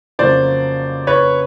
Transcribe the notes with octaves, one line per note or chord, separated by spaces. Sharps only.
F2 C#3 F#3 A#3 C5 D5
B4 C#5